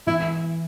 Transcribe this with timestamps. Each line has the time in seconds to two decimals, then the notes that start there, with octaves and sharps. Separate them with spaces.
0.07 E3 E4